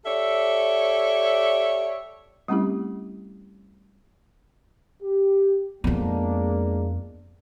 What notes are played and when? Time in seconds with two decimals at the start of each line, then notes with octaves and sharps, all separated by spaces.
0.05 G4 A4 C#5 D5 E5
2.48 G3 A3 C4 C#4 E4 G4
5.03 G4
5.84 F2 G#3 A#3 B3 D4